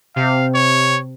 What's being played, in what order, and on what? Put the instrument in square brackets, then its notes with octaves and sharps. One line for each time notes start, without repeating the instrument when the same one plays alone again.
[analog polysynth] C3 [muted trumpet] F5
[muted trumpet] C#5